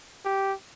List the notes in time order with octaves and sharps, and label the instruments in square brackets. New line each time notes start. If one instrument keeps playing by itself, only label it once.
[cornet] G4